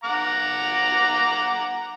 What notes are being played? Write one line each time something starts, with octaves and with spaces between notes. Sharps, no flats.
F#5 A#5 D6